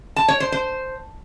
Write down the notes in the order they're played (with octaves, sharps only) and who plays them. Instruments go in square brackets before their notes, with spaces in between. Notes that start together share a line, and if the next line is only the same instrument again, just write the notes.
[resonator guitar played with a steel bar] A5
C#5
C5
C5